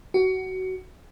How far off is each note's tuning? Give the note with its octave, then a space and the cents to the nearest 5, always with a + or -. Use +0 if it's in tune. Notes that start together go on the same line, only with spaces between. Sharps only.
F#4 +20